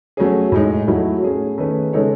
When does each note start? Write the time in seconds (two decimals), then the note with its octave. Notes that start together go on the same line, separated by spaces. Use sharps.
0.17 F#3 A3 C#4 G#4
0.52 A2 G#3 D#4
0.87 F#3 A3 E4
1.22 A3 C#4 G#4
1.58 D#3 A3 C#4 G#4 B4
1.93 C#3 G#3 D#4 A4 C#5